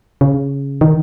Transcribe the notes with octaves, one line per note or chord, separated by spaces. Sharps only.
C#3
D#3